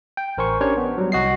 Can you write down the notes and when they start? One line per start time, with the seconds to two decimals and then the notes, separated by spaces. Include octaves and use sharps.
0.17 G5
0.38 A1 A#4 C5 G#5 C#6
0.61 C#4 D4 G4 A#4 C5 C#5
0.77 B3
0.98 F#3 G3
1.12 C2 F#4 D#5 C7